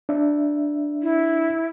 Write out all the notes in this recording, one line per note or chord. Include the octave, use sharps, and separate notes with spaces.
D4 E5
E4